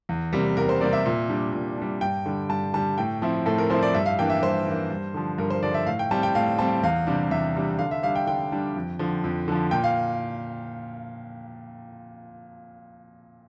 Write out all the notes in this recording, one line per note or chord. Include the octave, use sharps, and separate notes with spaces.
E2
C3 G3 A#3
E2 A#4
C5
C3 G3 A#3 D5
E5
A#2
G3 D4
A#2
G3 D4
G2 G5
D3 G3
G2 A5
D3 G3 A5
A2 G5
F3 C4 E4
A2 A4
A#4
F3 C4 E4 C5
D5
G2 E5
F5
E3 A#3 D4 G5
E5
G2 C5
E3 A#3 D4
G2
D3 F3
G2 A#4
C5
D3 F3 D5
E5
A2 F5
G5
G3 C4 A5
G5
A2 F5
G3 C4 A5
E2 F5
C3 G3 D4
E2 E5
C3 G3 D4
D3 F5
E5
G3 D4 F5
G5
D3 G5
G3 D4
F2
D3 F3
F2
D3 F3
A#2 G5
F5